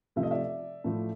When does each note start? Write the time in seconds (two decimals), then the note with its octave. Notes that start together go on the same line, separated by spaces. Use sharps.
0.16 C3 F3 A3 E5
0.23 D#5
0.31 D5 E5
0.84 A2 F3 A3